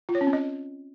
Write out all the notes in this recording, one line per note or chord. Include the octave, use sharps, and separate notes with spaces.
F4
C#5
C#4
C4
D#5